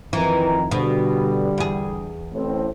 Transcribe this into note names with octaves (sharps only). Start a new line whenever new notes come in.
F2 D#3 E3 A#5
B2 D3 G3
E2 G#4
A1 A2 C4